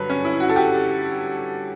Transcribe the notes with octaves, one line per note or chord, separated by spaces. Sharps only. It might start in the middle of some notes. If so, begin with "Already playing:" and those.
Already playing: G2 D3 F#3 B4 C#5
C#4
E4
F#4
A4
G4